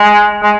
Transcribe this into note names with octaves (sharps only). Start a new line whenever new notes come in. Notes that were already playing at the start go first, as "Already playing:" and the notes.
Already playing: G#3
G#3